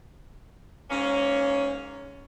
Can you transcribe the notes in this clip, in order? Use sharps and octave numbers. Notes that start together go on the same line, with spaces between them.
G#2 A#3 C#4